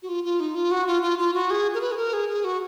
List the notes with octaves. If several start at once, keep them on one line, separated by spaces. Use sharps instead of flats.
F#4
F4
F4
D#4
F4
F#4
F4
F4
F4
F#4
G#4
A#4
B4
G#4
A#4
G#4
G#4
F#4